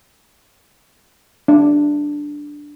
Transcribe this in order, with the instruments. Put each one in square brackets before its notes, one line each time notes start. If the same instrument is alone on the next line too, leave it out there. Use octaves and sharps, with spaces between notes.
[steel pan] D4